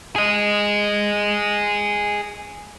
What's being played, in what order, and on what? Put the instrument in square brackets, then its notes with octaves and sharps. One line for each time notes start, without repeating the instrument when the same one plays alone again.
[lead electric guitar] G#4 D#5